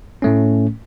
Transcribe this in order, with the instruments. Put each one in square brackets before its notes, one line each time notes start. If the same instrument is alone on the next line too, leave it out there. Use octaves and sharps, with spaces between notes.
[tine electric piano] A2 A3 C#4